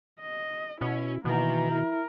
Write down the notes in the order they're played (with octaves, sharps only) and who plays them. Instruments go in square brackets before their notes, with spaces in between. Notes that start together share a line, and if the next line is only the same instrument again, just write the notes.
[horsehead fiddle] D#5
[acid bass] B2 [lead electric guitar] C#4 [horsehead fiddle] E4
[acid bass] B2 [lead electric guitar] D#3 [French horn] E3 [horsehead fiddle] A#3 A#5
[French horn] E4 [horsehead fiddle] A#4